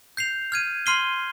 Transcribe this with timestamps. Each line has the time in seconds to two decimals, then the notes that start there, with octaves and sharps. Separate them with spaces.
0.17 G6 C7 F7
0.52 F6 G#6 D#7
0.86 C6 F6 C7 D#7 G7